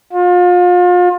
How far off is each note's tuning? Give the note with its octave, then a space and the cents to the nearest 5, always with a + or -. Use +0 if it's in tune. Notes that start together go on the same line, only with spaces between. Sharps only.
F4 +35